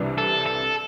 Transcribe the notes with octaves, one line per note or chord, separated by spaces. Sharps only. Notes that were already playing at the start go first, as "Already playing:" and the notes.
Already playing: C2 C3 E3 G3 D4
A4
A4